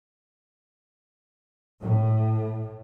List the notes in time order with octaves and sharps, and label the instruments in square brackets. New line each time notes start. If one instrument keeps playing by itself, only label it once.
[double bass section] A2